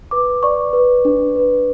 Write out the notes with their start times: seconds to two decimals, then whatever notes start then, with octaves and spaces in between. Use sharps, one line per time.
0.11 B4 D6
0.43 D5 C#6
0.73 B4
1.05 D4
1.36 B4